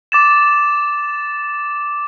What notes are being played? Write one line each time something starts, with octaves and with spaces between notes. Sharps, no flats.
D6 A6 E7